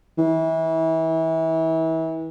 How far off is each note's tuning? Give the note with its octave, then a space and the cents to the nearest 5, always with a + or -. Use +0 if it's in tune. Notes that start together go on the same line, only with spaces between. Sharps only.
E3 -30